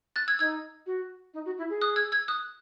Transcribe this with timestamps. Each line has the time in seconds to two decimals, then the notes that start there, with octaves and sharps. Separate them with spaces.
0.16 F#6 A6
0.28 E6 G#6
0.39 D#4 E6 G#6
0.86 F#4
1.34 D#4
1.45 F#4
1.58 E4
1.70 G#4
1.81 D#6 F#6
1.96 E6 G#6
2.12 E6 G#6
2.28 D#6 F#6